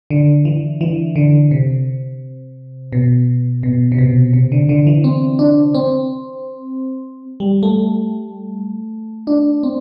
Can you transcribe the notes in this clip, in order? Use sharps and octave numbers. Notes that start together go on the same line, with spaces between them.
D3
E3
E3
D3
C3
B2
B2
C3
B2
C3
D3
D3
E3
C4
D4
C4
G3
A3
D4
C4